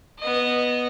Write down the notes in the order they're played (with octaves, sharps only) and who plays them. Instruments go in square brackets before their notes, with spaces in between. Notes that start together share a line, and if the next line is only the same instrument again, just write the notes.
[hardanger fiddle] B3 D#5